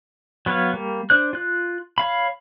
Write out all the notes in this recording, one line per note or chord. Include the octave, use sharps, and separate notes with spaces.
F#3 B3 B4 C#5 F5
G3 A#3
D4 C5 F#6
F4 F#6
C#5 F5 B5